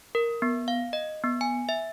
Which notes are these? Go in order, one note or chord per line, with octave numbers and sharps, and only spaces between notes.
A#4
B3
F5
D#5
B3
G#5
E5